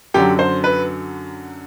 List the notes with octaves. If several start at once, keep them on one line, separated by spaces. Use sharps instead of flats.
F#2 D3 F#3 G4
C5
B4